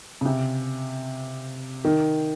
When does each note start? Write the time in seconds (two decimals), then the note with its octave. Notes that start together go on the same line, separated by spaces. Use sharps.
0.21 C#3
0.25 C3
1.85 D#3